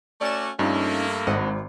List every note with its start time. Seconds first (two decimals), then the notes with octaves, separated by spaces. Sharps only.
0.21 A3 C#4 F#4 D5 E7
0.59 G2 A3 A#3 C#4 D#4 F4
1.27 G#1 D#5 F#5